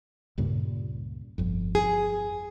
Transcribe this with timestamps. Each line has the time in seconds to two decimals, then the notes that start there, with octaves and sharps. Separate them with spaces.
0.38 C#2 G2 A#2
1.38 G1 F2
1.75 G#4